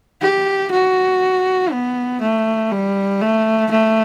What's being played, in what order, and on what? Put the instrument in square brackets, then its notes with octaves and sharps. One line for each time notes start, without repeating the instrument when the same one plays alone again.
[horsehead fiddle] G4
F#4
B3
A3
G3
A3
A3